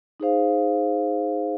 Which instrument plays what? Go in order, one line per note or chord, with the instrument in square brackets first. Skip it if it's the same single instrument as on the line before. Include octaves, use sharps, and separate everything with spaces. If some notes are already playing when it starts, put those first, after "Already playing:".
[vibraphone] D#4 G#4 C5 F5